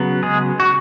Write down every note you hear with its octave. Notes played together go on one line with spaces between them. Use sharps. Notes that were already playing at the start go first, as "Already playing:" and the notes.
Already playing: C#3 F#3 B3
G#3 G#4
F#4